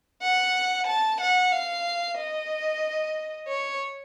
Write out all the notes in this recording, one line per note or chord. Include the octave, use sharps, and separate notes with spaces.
F#5
A5
F#5
F5
D#5
C#5